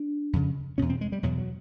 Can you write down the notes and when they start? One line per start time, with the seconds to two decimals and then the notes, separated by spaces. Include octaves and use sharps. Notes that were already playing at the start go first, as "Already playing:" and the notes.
Already playing: D4
0.33 F2 C#3
0.78 E2 B2 C#4
0.89 C4
1.01 G#3
1.12 G3
1.23 E2 B2 F#3
1.38 F#3